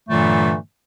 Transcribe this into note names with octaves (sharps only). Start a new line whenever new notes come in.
G2 A#2 D3 E3 F#3 A3